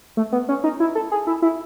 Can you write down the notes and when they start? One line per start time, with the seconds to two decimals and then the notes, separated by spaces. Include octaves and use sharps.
0.17 A3
0.32 B3
0.49 C#4
0.64 D#4
0.80 E4
0.95 A4
1.12 G#4
1.27 E4
1.42 E4